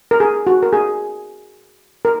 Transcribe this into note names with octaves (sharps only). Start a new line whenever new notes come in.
A#4
G#4
F#4
A#4
G#4
A#4